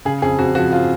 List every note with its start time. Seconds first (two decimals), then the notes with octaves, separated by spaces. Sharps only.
0.05 C#3 G#4
0.22 F2 G#4
0.39 F2 F#4
0.55 F3 F#4
0.72 F4